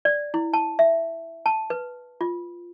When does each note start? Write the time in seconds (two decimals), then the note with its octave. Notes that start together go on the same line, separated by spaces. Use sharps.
0.05 D5
0.34 E4
0.53 A5
0.79 E5
1.46 A5
1.70 B4
2.21 F4